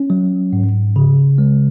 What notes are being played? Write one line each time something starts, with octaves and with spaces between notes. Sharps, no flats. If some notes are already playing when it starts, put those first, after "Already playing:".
Already playing: C#4
F#3
G#2
C#3
G#3